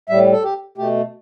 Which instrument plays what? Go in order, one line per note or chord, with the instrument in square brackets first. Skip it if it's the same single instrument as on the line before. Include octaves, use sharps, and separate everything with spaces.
[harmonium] A2 G3 E5
A4
G4
B2 A3 G4